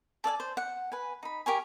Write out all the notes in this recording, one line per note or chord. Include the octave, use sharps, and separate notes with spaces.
A4 D5 F5 G#5
C5
F#5
B4 G#5
D#4 B5
G4 A#4 C#5 G#5